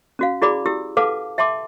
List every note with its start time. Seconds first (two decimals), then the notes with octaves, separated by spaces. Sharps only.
0.19 C#4 F#4 F5
0.42 E4 F#4 G#4 D5 B5 D6
0.66 E4 G4 E6
0.97 A4 B4 F5 F#5 A5 D6
1.38 E5 G5 A5 C6 D6